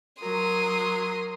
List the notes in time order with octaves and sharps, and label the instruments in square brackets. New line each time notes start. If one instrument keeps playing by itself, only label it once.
[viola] F#3 [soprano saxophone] A#4 [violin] C6 D#6